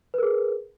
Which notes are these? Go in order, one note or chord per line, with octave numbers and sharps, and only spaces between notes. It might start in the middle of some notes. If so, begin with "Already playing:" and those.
G#4 A#4 B4